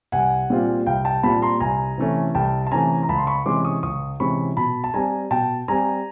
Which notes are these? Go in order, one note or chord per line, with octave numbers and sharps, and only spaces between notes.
C2 F#5 G#5
A#2 G3 C4 F4
C2 F5 G5
G5 A5
A#2 G3 C4 F4 A5 B5
A#5 C6
C2 G#5 A#5
C3 E3 A3 C#4
C2 G5 A5
A5
C3 E3 A3 C#4 G#5 A#5
A#5
C#2 A5 B5
C6
B5 C#6
C3 E3 G#3 C#4 C6 D6
C#6 D#6
C#2 C#6 D#6
C3 E3 G#3 C#4 B5 C#6
B2 A5 B5
A5
G3 C4 G#5 A#5
B2 G5 A5
G3 C4 G#5 A#5